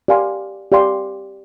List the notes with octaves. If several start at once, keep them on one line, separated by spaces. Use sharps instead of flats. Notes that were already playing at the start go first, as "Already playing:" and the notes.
G4 D5 F5 G#5 C6
G4 D5 F5 G#5 C6